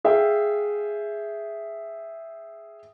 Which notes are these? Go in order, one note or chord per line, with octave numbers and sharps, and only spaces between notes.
G#4 E5 F5 G5 G#5